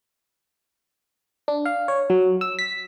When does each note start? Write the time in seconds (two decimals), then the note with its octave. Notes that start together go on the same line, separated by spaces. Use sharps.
1.48 D4
1.66 F5
1.88 C#5
2.10 F#3
2.41 E6
2.59 B6